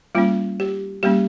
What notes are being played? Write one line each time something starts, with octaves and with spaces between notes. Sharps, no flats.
G3 A#3 C#4 F4
G4
G3 A#3 C#4 G4